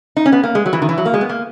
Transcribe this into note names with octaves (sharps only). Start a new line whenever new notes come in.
D#4
C#4
B3
A#3
G#3
F#3
E3
D#3
E3
F#3
A#3
G#3
B3
A#3